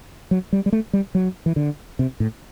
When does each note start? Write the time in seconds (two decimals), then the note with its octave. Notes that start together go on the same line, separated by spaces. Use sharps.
0.31 F#3
0.53 G3
0.66 G3
0.73 A3
0.93 G3
1.15 F#3
1.46 E3
1.56 D3
1.99 C3
2.20 A2